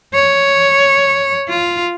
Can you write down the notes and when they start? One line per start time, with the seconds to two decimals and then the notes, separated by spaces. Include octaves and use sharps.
0.15 C#5
1.49 F4